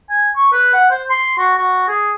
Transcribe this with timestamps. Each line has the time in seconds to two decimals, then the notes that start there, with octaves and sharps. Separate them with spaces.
0.10 G#5
0.36 C#6
0.52 B4
0.73 F#5
0.90 C5
1.10 C6
1.38 F#4
1.57 F#4
1.88 G#4